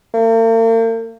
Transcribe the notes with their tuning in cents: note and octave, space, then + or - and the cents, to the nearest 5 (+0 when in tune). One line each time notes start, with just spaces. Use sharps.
A#3 -45